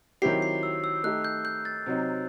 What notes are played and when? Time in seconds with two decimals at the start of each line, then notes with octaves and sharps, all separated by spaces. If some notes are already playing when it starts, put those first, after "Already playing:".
0.22 D#3 F#3 C4 E4 G4 C7
0.42 C7
0.63 E6
0.84 E6
1.03 A3 D#4 G4 F#6
1.25 G6
1.45 G6
1.65 A6
1.86 C3 F#3 C4 D#4